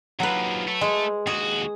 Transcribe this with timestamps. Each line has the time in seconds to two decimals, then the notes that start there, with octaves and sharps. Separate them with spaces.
0.20 D#2 F3 F#3 B4
0.68 A3
0.81 G#3
1.27 D#2 F#4 G#4